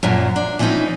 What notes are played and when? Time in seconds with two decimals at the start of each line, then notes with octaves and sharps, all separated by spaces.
0.03 F#2 A#2 F3 F#3
0.36 D4
0.59 E3 F3 C4 C#4 D#4 B4